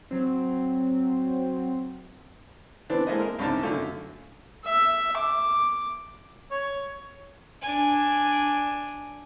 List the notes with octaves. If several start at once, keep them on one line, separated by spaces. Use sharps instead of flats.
F#3 C4
E3 B3 C4 D4
G#3 A#3 E4 A4 C5 D#5
A#4
C2 F#2 C#3 D4 D#4 A5
F#2 D3 A3 F4
E5
D6
C#5
D4 G#5